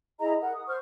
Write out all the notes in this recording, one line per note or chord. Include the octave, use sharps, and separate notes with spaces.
E4 G#4 D#5 A#5
A#4 F#5
D#6
C5 C#6 F6